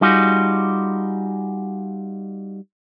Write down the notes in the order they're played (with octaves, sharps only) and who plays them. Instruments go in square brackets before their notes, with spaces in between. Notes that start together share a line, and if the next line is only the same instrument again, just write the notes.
[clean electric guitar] G3 D#4 F4 F#4 G#4